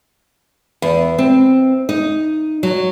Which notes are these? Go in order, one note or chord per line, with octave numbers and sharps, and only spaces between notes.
E2
C4
D#4
F#3